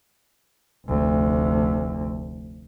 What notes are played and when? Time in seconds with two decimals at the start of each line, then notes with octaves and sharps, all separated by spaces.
0.87 F1 D2